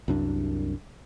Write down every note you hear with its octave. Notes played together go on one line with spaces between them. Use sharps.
C2 F#2 D4